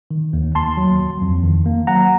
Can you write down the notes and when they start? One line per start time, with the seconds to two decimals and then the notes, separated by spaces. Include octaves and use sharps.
0.11 D#3
0.33 D#2
0.55 D#2 A5 C6
0.77 F#3
1.00 D#2
1.22 F2
1.43 D#3
1.66 A#3
1.87 F#3 F#5 A#5